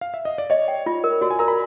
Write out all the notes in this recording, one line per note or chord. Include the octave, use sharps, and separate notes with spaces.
F5
E5
D#5
D5
C#5 D#5
G5
F4
A#4
F#4 D5
G#5
A#4 A#5
B5